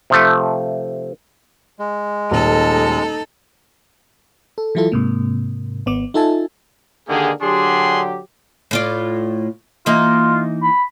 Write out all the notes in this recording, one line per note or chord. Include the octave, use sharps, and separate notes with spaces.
C3 F3 A3
G#3
D#1 D#4 A4
A4
E3 F#3 E4 F4 A4
G#2 C3 A#3
G#1 B3 D6
D#4 F4 A4 E5 G#5 A5
D3 D#3 A#3 G4 G#4
D3 F#3 D4 G4 G#4 C6
A2 F4 D5
E3 A#3 D#4 F4
B5